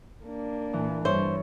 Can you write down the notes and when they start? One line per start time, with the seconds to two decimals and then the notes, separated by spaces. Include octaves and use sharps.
0.24 A#3 D4
0.73 A#2 E3
1.05 G2 C5 C#5 E5